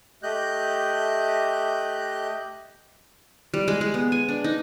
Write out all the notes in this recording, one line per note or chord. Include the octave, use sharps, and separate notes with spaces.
A3 G4 D#5 F#6 G6
G3
G#3
G#3
B3
G#5
D4
D#4